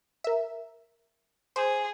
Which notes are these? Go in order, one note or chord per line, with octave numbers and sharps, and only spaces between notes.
A#4 E5
G#4 C5